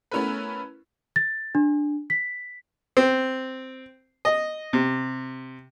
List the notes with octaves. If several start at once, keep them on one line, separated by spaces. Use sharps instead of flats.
A3 B3 C#4 E4 A#4 B4
A6
D4
B6
C4
D#5
C3